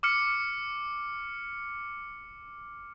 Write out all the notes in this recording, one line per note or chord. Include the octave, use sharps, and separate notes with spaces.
D6 F6 C#7